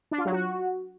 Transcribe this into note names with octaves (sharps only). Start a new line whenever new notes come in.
D4
F4
F#3
F#4